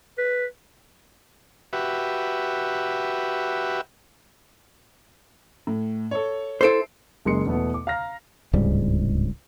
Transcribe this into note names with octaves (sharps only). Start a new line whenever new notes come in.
B4
F#4 G4 B4 E5
A2
A4 C#5
E4 A4 C5 C7 D7
F#1 G#3 A#3 C6 C#7
E2 B2 A3 B3
D6
F5 A#5 F6 A#6
D1 C#2 G#2 G3